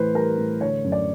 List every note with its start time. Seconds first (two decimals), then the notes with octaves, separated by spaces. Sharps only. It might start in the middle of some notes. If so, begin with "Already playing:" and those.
Already playing: A2 E3 B4 C5
0.14 G3 A#4
0.38 A2
0.61 D3 C#5
0.84 F#2
0.92 D5